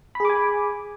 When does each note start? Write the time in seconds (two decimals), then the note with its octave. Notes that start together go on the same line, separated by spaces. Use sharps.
0.15 B5
0.20 G#4
0.25 D6
0.30 G#5